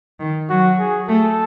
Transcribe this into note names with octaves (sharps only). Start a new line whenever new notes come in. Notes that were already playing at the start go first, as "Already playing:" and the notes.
D#3
F#3 F#4
G#4
A3 A4